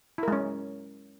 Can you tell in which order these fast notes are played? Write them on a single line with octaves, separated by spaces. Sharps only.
E4 A#4 G#3 C#4